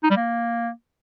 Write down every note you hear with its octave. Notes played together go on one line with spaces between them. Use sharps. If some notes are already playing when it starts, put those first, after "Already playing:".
D#4
G3
A#3